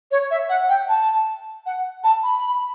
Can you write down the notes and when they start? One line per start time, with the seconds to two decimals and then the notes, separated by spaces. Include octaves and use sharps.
0.11 C#5
0.31 E5
0.49 F#5
0.69 G5
0.89 A5
1.66 F#5
2.04 A5
2.23 B5